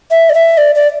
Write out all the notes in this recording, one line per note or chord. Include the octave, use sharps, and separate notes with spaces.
E5
D5
E5
D5
D5